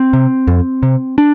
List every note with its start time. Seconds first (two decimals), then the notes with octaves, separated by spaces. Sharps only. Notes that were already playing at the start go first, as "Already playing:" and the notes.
Already playing: C4
0.13 C3
0.48 F2
0.83 C3
1.18 D4